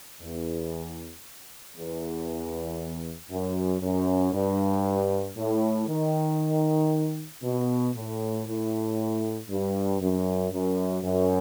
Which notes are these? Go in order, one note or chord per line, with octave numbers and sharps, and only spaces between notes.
E2
E2
F#2
F#2
G2
A2
D#3
B2
A2
A2
G2
F#2
F#2
F#2